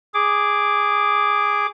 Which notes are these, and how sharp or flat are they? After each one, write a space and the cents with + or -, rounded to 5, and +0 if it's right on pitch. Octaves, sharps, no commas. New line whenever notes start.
G#4 -10 D6 +0